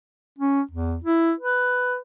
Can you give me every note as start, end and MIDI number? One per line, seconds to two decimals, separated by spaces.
0.39 0.61 61
0.71 0.97 40
1.04 1.33 64
1.40 1.98 71